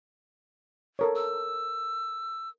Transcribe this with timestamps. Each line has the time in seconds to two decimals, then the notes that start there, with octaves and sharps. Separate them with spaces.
0.99 A4 A#4 C#5
1.16 E6